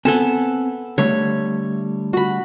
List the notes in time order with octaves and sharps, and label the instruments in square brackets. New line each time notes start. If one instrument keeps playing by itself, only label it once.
[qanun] B3 A4 A5 [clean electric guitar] C4 G#5
[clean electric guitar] D3 G3 A3 [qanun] C#5
[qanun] F#4 B5